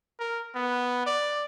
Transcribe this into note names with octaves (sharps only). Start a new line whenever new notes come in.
A#4
B3
D5